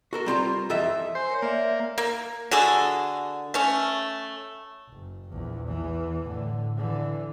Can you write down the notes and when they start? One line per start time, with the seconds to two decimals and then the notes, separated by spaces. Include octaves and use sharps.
0.13 F#4 A4 A#4
0.26 G3 C4 F4 A#5
0.70 F2 E3 A4 D#5 E5
1.15 C5 G#5
1.30 A#4 C#5
1.42 A#3 D5 E5
1.98 A#3
2.51 D3 F#4 G#4 A4
3.54 A3 C#4
4.89 F#1
5.28 A#1 E2
5.67 E2 E3
6.24 A2 D3
6.76 D3 E3